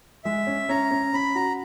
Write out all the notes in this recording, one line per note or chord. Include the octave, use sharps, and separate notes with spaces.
G#3 E5
C#4
C#4 A#5
C#4
C#4 B5
F#4 A#5